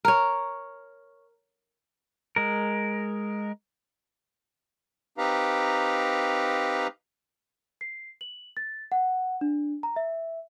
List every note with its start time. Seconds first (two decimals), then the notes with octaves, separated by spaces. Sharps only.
0.05 A#4 C#5
2.36 G#3 A#4
5.18 C4 D#4 G4 B4 F5 A#5
7.81 C7
8.21 F#7
8.57 A6
8.92 F#5
9.41 D4
9.83 A#5
9.96 E5